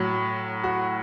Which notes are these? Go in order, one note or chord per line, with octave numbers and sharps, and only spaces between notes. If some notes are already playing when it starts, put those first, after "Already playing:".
Already playing: A2 F#3
F#4